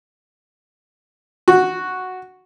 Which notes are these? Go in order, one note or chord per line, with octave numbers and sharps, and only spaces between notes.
F#4